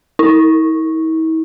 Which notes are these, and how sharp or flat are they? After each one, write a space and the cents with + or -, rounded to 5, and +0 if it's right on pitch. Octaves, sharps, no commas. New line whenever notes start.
E4 -45